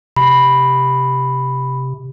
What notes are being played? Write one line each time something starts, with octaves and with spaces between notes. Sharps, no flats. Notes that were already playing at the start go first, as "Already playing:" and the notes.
C3 B5